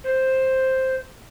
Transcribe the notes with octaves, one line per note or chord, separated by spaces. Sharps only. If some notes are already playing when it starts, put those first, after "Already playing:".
C5